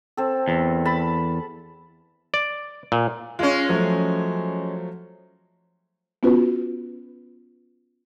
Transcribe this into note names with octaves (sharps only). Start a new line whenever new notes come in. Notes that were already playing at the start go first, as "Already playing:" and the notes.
C4 A4
E2
A5 B5
D5
A#2
G#3 C#4 F4
F3 F#3 A3
B3 C#4 F4 F#4 B4